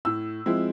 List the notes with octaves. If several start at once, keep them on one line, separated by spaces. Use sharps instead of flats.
A2 E6
F3 G#3 C4 E4